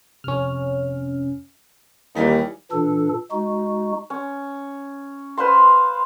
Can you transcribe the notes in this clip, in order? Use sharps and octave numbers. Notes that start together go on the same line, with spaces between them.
F2 C3 C#4 F6
D#2 E3 G3 D#4
A#2 E3 D4 A4
G#3 D#4 F#4
C#4
B4 C5 F5 C6